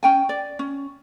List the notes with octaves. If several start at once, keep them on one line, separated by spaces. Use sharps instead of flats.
C#4 G5 G#5
D5
C#4